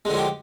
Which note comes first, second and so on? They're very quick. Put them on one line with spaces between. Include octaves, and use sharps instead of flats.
G#3 D3 F3 F#3 G4